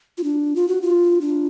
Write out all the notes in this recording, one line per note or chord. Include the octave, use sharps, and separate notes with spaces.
F4
D4
F4
F#4
F4
D4